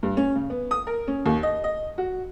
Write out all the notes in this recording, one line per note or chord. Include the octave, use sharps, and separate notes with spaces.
G2
C#4
C#3
B3
D#6
A#4
C#4
D#2
D#5
D#5
F#4